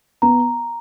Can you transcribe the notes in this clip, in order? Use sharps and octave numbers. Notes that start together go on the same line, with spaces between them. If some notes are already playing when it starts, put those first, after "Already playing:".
B3 A#5